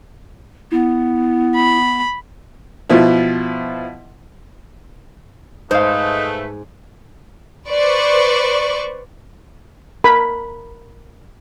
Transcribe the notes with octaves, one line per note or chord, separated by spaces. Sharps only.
B3 E4
B5
B2 F3 E4
G#2 A3 D#4 B4 C5 F5
B4 C5 D5 C#6
A#4 B5